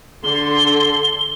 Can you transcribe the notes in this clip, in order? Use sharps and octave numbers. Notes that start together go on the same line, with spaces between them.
D3 A4 C6 G7